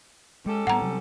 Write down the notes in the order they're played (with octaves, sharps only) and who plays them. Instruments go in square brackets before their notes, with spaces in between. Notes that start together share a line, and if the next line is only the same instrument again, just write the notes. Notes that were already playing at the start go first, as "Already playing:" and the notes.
[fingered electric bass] G#3 [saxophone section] C#4 G4 A4
[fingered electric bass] A2 G3 B3 [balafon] F#5 A#5
[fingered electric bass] C3 F#3 G3